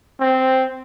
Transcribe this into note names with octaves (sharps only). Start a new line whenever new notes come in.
C4